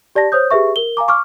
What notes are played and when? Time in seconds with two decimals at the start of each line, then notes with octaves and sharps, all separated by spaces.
0.15 G4 D5 A5 A#6
0.32 C5 C#5 D#6 G6
0.51 G4 G#4 B4 E5 C#6
0.76 A#4 G7
0.97 F5 G#5 A#5 D6
1.08 C#6 D6 F6